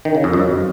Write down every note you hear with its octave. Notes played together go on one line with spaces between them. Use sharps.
D#3
C#3
F2
F#2